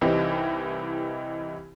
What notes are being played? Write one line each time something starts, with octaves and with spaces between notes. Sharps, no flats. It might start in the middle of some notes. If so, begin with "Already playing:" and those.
C2 E3 C4 D#4 G4